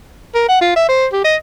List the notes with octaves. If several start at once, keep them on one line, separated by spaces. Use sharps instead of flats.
A#4
F#5
F4
E5
C5
G4
D#5